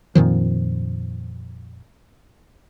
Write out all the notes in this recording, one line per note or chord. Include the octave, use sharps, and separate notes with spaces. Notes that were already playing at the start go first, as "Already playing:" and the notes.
F2 A#2 D#3 F3